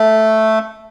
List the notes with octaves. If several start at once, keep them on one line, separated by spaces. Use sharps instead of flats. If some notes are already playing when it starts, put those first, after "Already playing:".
Already playing: A3